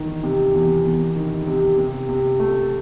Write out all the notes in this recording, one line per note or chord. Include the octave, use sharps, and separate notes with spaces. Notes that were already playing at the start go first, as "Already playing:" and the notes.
Already playing: E2 D#3
C3
E2
E2
D#3
C3
C3
C3
A3